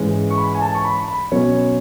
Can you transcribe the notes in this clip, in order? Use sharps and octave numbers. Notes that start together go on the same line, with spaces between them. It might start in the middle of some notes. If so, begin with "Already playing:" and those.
Already playing: G#2 E3 G#3 C#4
C#6
B5
G#5
A5
C#6
B5
B5
B2 F#3 C#4 C#5